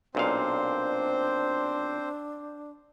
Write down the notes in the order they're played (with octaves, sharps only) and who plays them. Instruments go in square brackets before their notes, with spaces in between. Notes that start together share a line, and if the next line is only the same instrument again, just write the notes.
[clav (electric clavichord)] B1 A#2 F5 [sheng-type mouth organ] C4 C5 [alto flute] D4